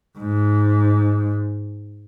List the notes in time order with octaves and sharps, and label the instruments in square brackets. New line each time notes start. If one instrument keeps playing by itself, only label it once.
[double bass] G#2